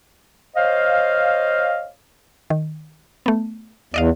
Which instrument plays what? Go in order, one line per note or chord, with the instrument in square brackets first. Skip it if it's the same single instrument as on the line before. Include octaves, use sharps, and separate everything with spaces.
[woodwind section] C5 C#5 D#5 F5
[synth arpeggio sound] D#3
A3 B3
[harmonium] E2 [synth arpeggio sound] D5 D#5 F5